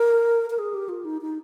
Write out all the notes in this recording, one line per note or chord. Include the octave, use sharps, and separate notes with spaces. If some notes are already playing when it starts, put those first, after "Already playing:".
Already playing: A#4
A#4
G#4
G4
F4
D#4
D#4